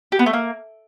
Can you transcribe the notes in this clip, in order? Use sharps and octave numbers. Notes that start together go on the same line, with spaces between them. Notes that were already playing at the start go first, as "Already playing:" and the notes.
G4
B3
A3
A#3